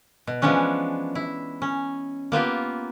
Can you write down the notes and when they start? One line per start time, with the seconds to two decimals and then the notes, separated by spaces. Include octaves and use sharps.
0.27 B2
0.42 E3 F3 G#3 B3 C#4 D4
1.15 E4
1.62 C#4
2.32 A#3 B3 F4 G4